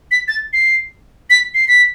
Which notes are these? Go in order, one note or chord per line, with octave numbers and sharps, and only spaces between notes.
B6
A6
C7
B6
C7
B6